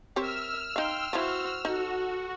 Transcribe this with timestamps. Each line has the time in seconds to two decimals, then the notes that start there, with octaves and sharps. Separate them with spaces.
0.16 C4 G4 A#4 C#5 E5 E6 F6
0.76 D#4 F5 G5 C6
1.13 F3 E4 F#4 C5
1.65 D#4 F#4 A4